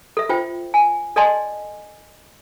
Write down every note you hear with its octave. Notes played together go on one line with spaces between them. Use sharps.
A4 E5
F4 C5 G5
G#5
A4 D5 D#5 G#5 A5 C6